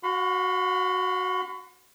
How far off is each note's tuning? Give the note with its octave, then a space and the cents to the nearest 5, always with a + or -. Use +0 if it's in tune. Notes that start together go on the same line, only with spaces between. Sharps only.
F#4 +0 F5 +45 B5 +45